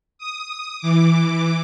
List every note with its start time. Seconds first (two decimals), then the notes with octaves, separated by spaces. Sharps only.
0.19 D#6
0.79 E3 D6